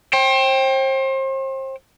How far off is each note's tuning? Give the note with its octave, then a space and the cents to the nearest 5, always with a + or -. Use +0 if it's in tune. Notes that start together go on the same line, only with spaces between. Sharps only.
C5 +35 G5 +0